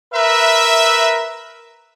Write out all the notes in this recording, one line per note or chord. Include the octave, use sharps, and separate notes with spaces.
A#4 B4 E5